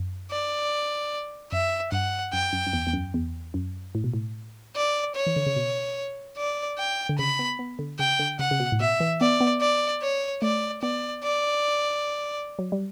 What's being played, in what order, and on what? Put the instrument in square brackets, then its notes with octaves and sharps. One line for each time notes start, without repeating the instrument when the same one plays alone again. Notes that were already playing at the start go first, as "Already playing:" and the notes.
Already playing: [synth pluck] F#2
[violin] D5
[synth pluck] F#2 [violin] E5
[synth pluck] G2 [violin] F#5
[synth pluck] F#2 [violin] G5
[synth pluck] F#2
F#2
E2
E2
F#2
E2
F#2
A2
B2
A2
[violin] D5
C#5
[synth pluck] E3
D3
C#3
B2
[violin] D5
G5
[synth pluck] D3
[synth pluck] C#3 [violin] B5
[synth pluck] B3
B3
D3
[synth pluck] C#3 [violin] G5
[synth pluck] D3
[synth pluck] C#3 [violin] F#5
[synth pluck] C#3
B2
A2
[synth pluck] B2 [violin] E5
[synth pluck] E3
[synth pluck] B3 [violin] D5
[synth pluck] B3
[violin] D5
C#5
[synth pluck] A3 [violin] D5
[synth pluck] B3 [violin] D5
[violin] D5
[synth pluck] F#3
G3